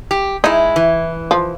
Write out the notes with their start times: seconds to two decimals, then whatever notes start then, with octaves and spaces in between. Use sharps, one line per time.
0.11 G4
0.44 G#3 D#4 E4
0.76 E3
1.31 F3